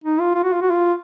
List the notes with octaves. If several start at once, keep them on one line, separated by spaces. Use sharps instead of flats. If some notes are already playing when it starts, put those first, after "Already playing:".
D#4
F4
F4
F#4
F4
F#4
F4